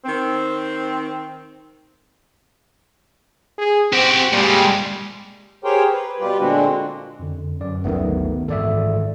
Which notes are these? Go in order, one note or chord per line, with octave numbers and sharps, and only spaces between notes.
D#3 C4
G#4
C4 F#4 G4
A#2 G3 G#3
G4 G#4 A#4 C5 C#5 G5
B4
B2 G3 F4 G4 B4
A#2 D3 G#3 C4 D4 F#4
F2 D3
F#2 D5
G1 D2 D#3 F#3 A3 B3
G#2 D#3 E3 A4 D5 E5